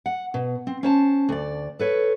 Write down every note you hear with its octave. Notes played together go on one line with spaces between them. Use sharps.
F#5
B2
C4
C#4 C5 A5
D2 D5
A4 B4 C#5